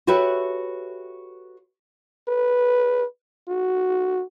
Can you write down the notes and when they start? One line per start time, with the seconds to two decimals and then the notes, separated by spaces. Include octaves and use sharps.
0.07 F#4 G4 A4 B4 C#5 E5
2.28 B4
3.48 F#4